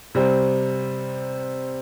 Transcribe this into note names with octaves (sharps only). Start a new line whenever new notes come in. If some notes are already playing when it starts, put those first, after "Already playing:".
C3 G3 C4